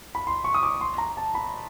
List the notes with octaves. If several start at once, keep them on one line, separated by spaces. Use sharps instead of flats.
B5
C6
C#6
D#6
D6
C6
A#5
A5
B5